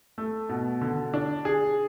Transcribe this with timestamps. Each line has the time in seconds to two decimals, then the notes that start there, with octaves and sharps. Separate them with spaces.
0.18 A3
0.49 B2
0.81 D3
1.14 D4
1.45 G#4